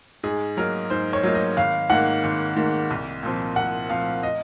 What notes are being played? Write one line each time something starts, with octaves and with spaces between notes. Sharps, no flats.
G#2 G#4
F#3 A#3 D#4 A#4
G#2 C5
C#5
F#3 A#3 D#4
D#5
G#1 F5
G#2 D#3 A#3 F#5
G#1
G#2 D#3 A#3
C2
A#2 F3 C4
C2 F#5
A#2 F3 C4 F5
D#5